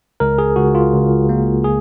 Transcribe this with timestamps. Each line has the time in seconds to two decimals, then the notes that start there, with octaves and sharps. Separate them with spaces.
0.20 C#2 A#4
0.38 G#4
0.56 C#2 F#4
0.75 F4
0.93 C#2
1.29 A#3
1.64 G#4